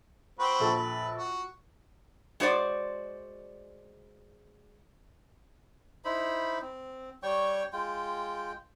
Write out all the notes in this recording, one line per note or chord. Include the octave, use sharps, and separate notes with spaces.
C4 F#4 B4
A#1 A4
B4
F#4
G#3 F#4 C5 D5
D#4 E4 C5 B5
C4
G3 C#5 G5 C#6
G#3 F4 G5